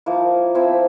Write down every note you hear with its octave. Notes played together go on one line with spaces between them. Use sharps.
F3 A#3 E4
F3 C4 E4